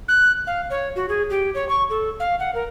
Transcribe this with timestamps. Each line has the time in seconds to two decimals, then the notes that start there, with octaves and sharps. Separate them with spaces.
0.08 F#6
0.47 F5
0.70 C#5
0.96 F#4
1.09 G#4
1.30 G4
1.55 C#5
1.69 C#6
1.90 A4
2.20 F5
2.39 F#5
2.55 A#4